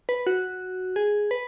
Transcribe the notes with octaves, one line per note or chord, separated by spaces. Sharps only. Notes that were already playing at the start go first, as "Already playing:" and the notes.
B4
F#4
G#4
B4